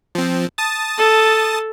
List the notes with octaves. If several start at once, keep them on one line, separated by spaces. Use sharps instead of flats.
F3 C4
A5 D#6 A6
A4